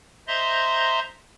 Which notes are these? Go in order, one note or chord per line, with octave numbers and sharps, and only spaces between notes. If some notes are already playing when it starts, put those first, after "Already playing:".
C5 D#5 E5 A#5 C6